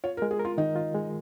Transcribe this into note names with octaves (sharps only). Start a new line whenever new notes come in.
F4 C#5
A#4
G#3
G#4
A#4
F4
D#3 D#4
F4
G#3